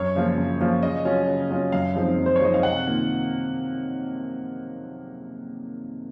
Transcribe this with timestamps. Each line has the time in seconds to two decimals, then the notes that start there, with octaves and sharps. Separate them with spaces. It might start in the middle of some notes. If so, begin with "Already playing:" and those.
Already playing: F#2 C#5
0.15 C#3 F3 A#3 F4
0.38 F#2
0.61 C#3 F3 A#3 F4
0.83 C#3 D#5
1.05 F#3 C#4 F4
1.27 C#3
1.51 F#3 C#4 F4
1.72 F#2 F5
1.95 F3 G#3 C4 D#4
2.18 F#2
2.26 C5
2.36 C#5
2.41 F3 G#3 C4 D#4 D#5
2.54 F5
2.63 C3 F#5
2.86 D#3 A#3 F4